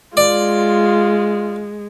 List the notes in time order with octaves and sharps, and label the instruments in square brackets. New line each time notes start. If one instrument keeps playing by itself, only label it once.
[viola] G#3 [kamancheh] F4 [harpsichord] D5